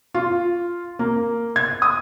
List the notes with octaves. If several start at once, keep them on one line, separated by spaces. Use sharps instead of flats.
F4
A#3
G#6
D#6